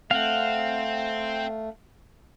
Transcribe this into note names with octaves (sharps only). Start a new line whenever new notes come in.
A3 C4 F5 F#5